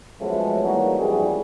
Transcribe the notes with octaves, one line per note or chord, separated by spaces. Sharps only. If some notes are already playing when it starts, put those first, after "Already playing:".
F3 F#3 G#3 A3 B3 C#4
E3 G3 A#3 C#4 D#4 F#4
F2 G#2 E3 G3 G#4